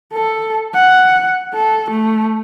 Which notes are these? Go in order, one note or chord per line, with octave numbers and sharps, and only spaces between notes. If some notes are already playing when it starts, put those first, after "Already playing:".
A4
F#5
A4
A3